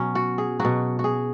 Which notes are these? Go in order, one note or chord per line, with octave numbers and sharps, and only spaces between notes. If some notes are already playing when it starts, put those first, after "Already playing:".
Already playing: B2 F#3 C#4
F#4
G#4
F#3 F#4
B2
F#4
G#4